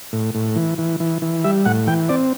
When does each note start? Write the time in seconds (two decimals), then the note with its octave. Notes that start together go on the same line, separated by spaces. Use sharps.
0.13 A2
0.35 A2
0.56 E3
0.78 E3
1.00 E3
1.22 E3
1.44 G3 E5
1.65 A2 F#5
1.87 E3 G5
2.09 C4 D5